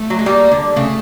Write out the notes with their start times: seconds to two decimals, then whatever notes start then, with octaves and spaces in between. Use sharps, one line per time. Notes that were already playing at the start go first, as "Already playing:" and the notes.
Already playing: A3
0.10 F#3
0.19 G#3
0.26 G3 A#3
0.51 D3
0.76 C#3 A3